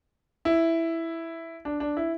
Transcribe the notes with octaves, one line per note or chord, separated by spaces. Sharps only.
E4
D4
D4
E4